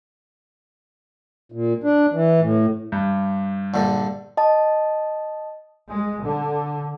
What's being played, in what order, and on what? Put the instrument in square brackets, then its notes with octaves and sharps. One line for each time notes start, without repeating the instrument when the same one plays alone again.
[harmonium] A#2
D4
E3
A2
[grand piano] G2
[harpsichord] A#1 G2 D3
[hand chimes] D#5 A5
[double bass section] G#3
D3